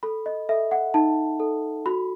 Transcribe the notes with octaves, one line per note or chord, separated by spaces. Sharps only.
A4 B5
D#5
A4 E5
F#5
D#4 A5
A4
F#4 B5